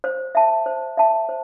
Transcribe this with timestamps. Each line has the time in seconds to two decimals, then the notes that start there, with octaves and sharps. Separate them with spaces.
0.04 C5
0.35 E5 A5
0.66 C5
0.97 E5 A5
1.29 C5